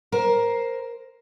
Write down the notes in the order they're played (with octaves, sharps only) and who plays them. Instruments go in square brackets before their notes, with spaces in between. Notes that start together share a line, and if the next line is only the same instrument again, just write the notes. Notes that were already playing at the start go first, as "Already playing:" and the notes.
[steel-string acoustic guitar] A#4 C5